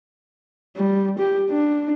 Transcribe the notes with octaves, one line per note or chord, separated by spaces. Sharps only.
G3
G4
D4